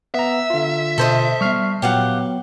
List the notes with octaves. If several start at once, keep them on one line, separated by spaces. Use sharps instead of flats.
B3 E5 A#5
D3 F4
B2 A4 C5 D#5
G3 B3 C#6 F6 C7
A#2 F#3 B3 G4 F5 F#5